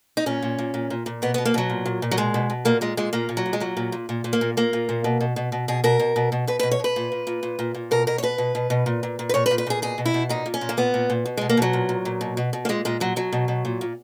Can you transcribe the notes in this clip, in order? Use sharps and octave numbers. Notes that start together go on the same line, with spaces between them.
D#4
A#2 C#4
A#2
A#2
A#2
A#2
A#2
B2 B3
B3
B2
A#3
B2 F#3
A#2
A#2
A#2
F#3
B2 G#3
B2
B2
A#2 A#3
A#2 G#3
A#2 G#3
A#2 A#3
A#2
F#3
A#2
G#3
A#2 F#3
A#2
A#2
A#2
A#2
A#3
A#2
A#2 A#3
A#2
A#2
B2
B2
B2
B2
B2 G#4
B2 A#4
B2
B2
B2
B2 B4
B4
B2
C#5
B2 B4
A#2
A#2
A#2
A#2
A#2
A#2
B2 A#4
B2 A#4
C#5
B2 B4
B2
B2
B2
A#2
A#2
A#2
B4
A#2 C#5
B4
A#2
B4
A#2 G#4
B2 G#4
B2
E4
B2
A#2 D#4
A#2
C#4
A#2
A#3
A#2 B3
A#2
A#2
B2
G#3
B2
A#3
B2 F#3
A#2
A#2
A#2
B2
B2
B2
A#3
A#2 G#3
A#2 G#3
A#2 F#3
B2 F#3
B2
B2
A#2
A#2